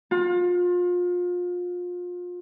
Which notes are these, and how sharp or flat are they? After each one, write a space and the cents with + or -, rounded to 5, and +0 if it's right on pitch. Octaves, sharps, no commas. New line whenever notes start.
F4 +30